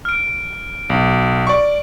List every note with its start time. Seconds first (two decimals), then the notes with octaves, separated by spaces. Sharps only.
0.05 F6 D7
0.90 B1
1.47 D5 C#6